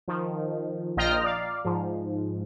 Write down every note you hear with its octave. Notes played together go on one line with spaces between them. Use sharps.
D#3 F3
A#1 F4 D#5 G5 A#5 F6
D5 F5
G#2 F3